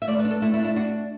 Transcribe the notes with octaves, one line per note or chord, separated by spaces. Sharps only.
E5
A3 D5
B4
D4
A4
A3 E4
E4
D4
E4
D4 F#4